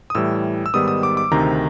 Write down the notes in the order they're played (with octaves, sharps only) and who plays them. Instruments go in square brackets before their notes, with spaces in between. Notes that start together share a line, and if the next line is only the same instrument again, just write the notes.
[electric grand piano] D#6
A2 E3 G3 E6
E6
G#2 D#3 G3 B3 D#6
D#6
D6
D6
D2 C3 D#3 A#5